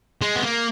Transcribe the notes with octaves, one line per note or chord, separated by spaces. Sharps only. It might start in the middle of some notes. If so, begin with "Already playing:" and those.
G#3
B3
A#3